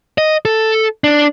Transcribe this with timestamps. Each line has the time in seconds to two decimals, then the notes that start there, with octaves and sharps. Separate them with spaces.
0.18 D#5
0.45 A4
1.04 D4